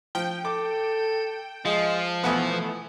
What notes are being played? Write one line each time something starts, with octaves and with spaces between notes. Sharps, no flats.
F3 G5
A4 D6
F3 G#3
B2 E3 A3 B3 F#5 G#5 D#6